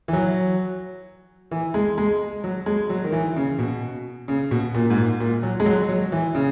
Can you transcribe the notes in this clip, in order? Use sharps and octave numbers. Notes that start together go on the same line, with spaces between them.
E3
F#3
E3
G#3
G#3
F#3
G#3
F#3
D#3
E3
C#3
B2
C#3
B2
A#2
G#2
A#2
A#2
F#3
G#3
F#3
F#3
E3
C#3